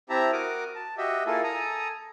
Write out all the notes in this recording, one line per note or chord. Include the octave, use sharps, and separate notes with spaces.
C4 E4 G4 E5 A5 A#5
F#4 A#4 D6 D#6
A5
F#4 G4 D#5 E5
A#3 E4 F4 G#4 A4
A4 G#5 A#5 D#6